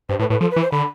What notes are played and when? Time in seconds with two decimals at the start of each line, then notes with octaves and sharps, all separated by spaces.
0.09 G2 C5
0.19 A2 B4
0.30 A2 B4
0.41 F3 A4
0.51 B4
0.56 E3
0.62 C5
0.72 D3 B5